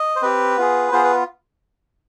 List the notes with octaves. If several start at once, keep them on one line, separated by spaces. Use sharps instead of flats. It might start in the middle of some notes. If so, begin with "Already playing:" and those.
Already playing: D#5
C5
C4 G4 B4
B3 F4 G#4
B3 F4 G#4 C5
B4